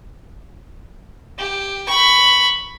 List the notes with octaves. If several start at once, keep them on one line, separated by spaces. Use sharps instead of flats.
G4
B5 C#6